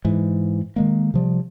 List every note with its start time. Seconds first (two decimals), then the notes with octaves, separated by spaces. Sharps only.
0.05 G#2 E3
0.76 D#3 G#3 A#3
1.14 C3 F3 G3